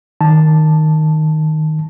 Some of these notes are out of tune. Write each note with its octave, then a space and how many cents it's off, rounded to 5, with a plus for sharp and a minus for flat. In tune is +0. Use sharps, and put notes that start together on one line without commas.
D#3 +0 A5 +0